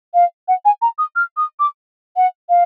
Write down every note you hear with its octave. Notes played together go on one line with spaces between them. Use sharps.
F5
F#5
G#5
A#5
D#6
F6
D#6
D6
F#5
F5